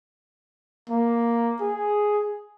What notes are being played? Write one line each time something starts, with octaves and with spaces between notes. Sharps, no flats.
A#3
G#4